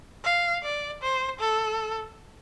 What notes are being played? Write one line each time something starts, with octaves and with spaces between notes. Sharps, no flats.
F5
D5
C5
A4